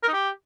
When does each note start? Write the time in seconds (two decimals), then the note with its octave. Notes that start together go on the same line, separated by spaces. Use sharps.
0.03 A#4
0.08 D#4
0.13 G4